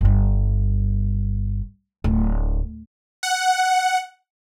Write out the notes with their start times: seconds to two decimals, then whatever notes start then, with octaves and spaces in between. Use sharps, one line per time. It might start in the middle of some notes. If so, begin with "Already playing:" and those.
0.01 G1 G2
2.04 D1
3.23 F#5